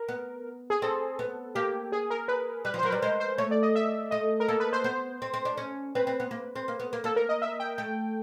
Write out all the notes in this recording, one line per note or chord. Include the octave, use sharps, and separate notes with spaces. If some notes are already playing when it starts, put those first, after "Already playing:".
Already playing: A#4
B3
G#4
C4 A4
B3
A#3 G4
G#4
A#4
B4
G3 B4
F3
C5
F#3 A#4
G3 B4
G#3 C5
C5
A3 C#5
D5
D#5
E5
A3 D#5
A#4
A#3 A4
B4
C5
B3 C5
C4
C4
D4
C#4
C4 B4
C4
B3
A#3
C4
A#3
B3
A#3
A#3 A4
A#4
D#5
E5
G5
A3 G5